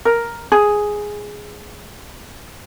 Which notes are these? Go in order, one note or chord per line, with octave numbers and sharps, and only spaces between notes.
A#4
G#4